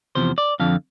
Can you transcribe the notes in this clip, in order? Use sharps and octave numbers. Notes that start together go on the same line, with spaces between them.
E2 C3 F3 C5
D5
F2 D3 F3 F5